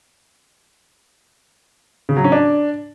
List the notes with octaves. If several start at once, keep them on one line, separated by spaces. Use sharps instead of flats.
C#3
F#3
C#4
D4